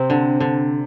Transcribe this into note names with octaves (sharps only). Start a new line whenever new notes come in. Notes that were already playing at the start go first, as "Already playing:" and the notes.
Already playing: C3 C4
D3
D3